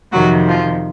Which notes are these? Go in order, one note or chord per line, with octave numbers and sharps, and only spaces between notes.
F2 C3 D#3 F#3 F#4
F3 F4